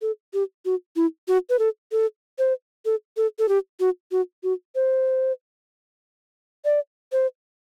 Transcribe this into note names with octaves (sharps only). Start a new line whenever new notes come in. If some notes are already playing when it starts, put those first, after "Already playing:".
A4
G4
F#4
E4
F#4
B4
A4
A4
C5
A4
A4
A4
G4
F#4
F#4
F#4
C5
D5
C5